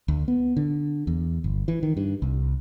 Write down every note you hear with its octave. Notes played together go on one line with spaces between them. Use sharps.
D2
B3
D3
E2
G1
E3
D#3
G2
C2